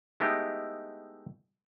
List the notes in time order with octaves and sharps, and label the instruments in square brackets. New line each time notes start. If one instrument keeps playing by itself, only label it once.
[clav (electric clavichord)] G#3 A3 B3 D#4 E4 G4